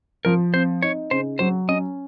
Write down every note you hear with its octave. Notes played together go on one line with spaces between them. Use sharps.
F3 A#4
C4 C5
D#4 C#5
C#3 C5
F#3 C5
C#4 D#5